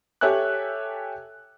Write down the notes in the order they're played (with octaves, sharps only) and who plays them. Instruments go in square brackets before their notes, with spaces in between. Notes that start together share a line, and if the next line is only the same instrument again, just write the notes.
[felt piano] G4 A4 C#5 E5 G#5 F#6